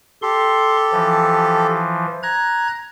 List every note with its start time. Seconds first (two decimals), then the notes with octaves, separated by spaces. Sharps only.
0.22 G4 A4 C6
0.93 E3 F3
2.23 A#5 F#6 G#6